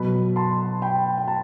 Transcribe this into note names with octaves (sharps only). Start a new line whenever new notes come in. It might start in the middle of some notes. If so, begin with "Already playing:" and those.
Already playing: B2 F#3 B3 B5
A5 C6
G5 B5
G5
A5